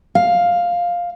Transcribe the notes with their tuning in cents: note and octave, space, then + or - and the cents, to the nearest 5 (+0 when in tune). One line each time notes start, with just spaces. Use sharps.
F5 +5